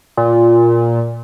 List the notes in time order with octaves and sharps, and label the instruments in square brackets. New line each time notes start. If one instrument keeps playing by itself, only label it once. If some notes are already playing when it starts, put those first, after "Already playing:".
[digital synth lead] A#2